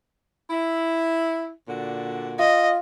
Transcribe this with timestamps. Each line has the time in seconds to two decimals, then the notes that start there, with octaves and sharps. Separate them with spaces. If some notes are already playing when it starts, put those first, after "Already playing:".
0.50 E4
1.67 A#2 D3 F#4
2.39 F4 D#5